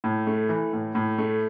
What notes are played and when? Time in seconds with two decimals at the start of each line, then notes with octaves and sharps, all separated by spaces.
0.04 A2
0.27 A3
0.49 E3
0.73 A2
0.95 A2
1.18 A3